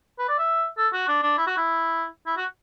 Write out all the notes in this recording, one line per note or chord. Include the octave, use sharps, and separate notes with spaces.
B4
D5
E5
A4
F#4
D4
D4
E4
F#4
E4
E4
F#4